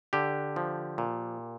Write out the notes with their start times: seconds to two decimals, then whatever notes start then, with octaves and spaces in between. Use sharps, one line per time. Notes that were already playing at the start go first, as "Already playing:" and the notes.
0.13 D3 G4
0.56 F3
0.98 A#2